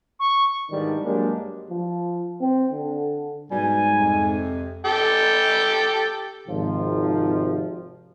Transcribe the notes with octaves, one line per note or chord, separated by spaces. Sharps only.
C#6
G#2 D#3 E3 G3 D4
G2 F#3 G#3 A#3 D4 G4
F3
C4
D3
G#2 B2 G3 G#5
F2 C3
G4 A4 G5
G#1 C3 F3